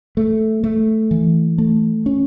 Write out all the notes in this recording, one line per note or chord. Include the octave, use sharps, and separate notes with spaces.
A3
A3
E3
A3
C#4